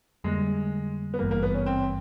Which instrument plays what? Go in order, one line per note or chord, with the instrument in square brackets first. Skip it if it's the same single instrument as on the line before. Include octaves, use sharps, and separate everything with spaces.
[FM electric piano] F2 D3 G3 A#3 [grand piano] G#3
[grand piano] B3
[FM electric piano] G#1 G2 E3 G3 [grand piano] A#3
[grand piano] A#3
B3
C#4
C4